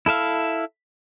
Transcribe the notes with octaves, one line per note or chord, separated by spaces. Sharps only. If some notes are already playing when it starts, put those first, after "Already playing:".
E4 A4 E5 F5